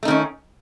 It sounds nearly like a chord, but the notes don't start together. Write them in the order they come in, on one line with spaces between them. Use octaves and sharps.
A3 D#4 D#3 C#4